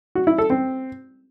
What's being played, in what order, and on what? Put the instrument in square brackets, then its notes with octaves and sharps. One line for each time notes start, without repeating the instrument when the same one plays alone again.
[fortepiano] F#4
E4
A4
C4